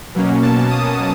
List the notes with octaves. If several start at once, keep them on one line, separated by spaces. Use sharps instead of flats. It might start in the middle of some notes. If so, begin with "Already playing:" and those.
B2 F#3 A#3 C#4
A5
D#6